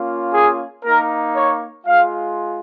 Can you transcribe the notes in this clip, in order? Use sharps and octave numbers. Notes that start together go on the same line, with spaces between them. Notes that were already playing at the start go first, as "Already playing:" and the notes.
Already playing: A#3 C#4 F4
G#4
A#3 D#4 A#4
C#5
G#3 F4 F5